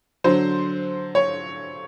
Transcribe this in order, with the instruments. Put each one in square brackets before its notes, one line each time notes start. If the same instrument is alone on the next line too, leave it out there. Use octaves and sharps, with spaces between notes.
[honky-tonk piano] D3 F#3 C5
C#5